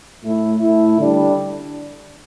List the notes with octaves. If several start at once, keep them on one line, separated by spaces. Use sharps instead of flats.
A2 A3 E4
A2 A3 E4
D3 G3 D4